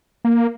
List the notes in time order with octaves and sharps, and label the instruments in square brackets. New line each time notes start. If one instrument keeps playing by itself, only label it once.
[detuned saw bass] A#3